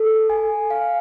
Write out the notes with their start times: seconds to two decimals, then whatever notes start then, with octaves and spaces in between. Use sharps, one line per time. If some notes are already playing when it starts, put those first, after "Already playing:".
Already playing: A4
0.30 G#5
0.70 F5